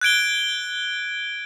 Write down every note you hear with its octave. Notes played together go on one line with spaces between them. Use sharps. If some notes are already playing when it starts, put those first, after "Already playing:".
F#6 G#6 D7 G7